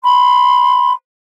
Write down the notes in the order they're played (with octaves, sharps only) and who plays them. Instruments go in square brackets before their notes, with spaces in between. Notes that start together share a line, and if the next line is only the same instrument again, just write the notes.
[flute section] B5 C6